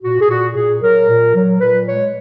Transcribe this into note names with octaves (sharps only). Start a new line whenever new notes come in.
A#2 F#4
G#4
A#2 F#4
A#2 G#4
F#3 A#4
A#2
F#3
A#2 B4
G#3 C#5